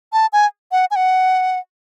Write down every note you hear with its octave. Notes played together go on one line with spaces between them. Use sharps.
A5
G#5
F#5
G#5
F#5